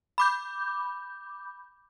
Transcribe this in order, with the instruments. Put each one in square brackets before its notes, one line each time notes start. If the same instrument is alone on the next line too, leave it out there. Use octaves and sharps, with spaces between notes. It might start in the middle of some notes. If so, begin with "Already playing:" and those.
[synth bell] B5 D6 G6